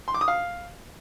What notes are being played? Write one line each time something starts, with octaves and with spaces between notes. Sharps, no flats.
C6
D6
D#6
F5